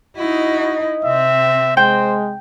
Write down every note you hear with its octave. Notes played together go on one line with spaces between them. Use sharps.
D#4 E4 F#4 D#5
C3 C4 E5
G#3 C5 G5